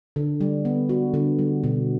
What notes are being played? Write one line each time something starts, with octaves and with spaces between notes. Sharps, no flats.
D3
G3
B3
F#4
D3
G3
B2